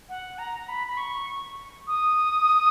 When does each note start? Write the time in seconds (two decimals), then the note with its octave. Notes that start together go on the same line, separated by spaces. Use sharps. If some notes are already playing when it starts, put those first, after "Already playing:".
0.09 F#5
0.38 A#5
0.69 B5
0.87 B5
0.97 C#6
1.87 D#6